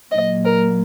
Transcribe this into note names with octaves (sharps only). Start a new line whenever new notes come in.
A#2 F#3 D#5
A#4